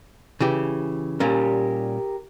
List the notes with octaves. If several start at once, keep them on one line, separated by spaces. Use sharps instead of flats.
C#3 E3 G4
A#2 G3 C#4 G4 A#4